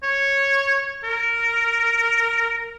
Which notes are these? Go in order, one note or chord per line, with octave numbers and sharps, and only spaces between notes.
C#5
A#4